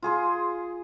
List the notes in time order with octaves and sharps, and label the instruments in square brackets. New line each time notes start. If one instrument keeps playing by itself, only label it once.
[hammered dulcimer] F4 G#4 C6